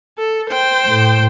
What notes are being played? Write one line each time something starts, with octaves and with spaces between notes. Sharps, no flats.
A4
C5 G5
A2